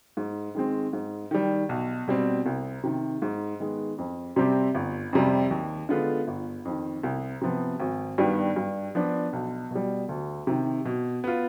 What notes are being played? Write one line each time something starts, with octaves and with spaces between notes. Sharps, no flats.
G#2
D#3 G#3 C4
G#2
D#3 G3
B1
B2 G3 C4
C2
C3 D#3
G#2
D#3 G#3 B3
F2
C3 G3 C4 G4
G1
F2 C3 G3
D#2
D3 G#3 B3 F4
G1
F2 D#3
C2
C3 F3 B3
G#1
G2 D#3 G3 B3
G2
F3 B3 D4
B1
B2 G3
D2
C3 D#3
B2
B3 F4